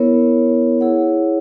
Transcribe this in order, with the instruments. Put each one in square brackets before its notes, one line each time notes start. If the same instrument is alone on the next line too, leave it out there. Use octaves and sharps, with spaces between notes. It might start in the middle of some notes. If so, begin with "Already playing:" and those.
Already playing: [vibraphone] B3 E4 A#4 C#5
E4 G#4 C#5 F#5